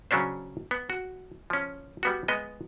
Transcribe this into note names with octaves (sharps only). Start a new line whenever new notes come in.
C#3 F#3 C#4 D4 C5
B3
F#4
F3 C#4
G3 B3 F#4
G#3 B3 D#5